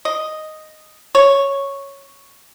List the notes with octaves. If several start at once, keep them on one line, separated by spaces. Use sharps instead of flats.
D#5
C#5